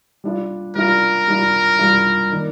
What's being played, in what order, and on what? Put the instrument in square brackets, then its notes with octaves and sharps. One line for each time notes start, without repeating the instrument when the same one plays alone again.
[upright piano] G3 D4 F4
[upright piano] G3 D4 F4 [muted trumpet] A#4
[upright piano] G3 D4 F4
G3 D4 F4
D#3 A#3 D4